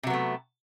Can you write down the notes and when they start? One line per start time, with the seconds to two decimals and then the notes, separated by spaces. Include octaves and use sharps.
0.03 C3
0.07 F#3
0.10 B3
0.13 A3